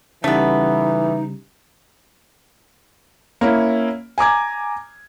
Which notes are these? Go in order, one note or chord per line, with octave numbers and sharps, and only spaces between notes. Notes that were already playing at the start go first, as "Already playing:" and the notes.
C#3 E3 G3 A3 B3 D#4
A#3 C#4 E4
G#5 A#5 D6 G#6